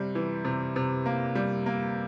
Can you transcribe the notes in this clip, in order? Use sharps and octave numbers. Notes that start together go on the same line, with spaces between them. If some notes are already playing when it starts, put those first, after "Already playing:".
Already playing: C3 G3
E3
C3
C3
A#3
G3
A#3